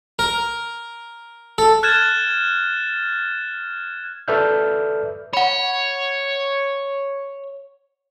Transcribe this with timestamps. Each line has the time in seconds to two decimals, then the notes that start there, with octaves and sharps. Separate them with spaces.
0.19 A#4
1.58 A4
1.83 F6 F#6 G#6 A6 E7
4.28 A4 B4 D5 E5 F6 G6
5.33 C#5 F#5 B5